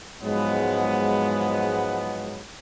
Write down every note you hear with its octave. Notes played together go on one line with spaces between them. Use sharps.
G#2 F3 F#3 G#3 B3